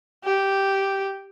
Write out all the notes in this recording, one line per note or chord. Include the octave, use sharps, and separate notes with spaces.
G4